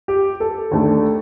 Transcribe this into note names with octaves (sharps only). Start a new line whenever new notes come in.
G4
A4
D#2 D3 A3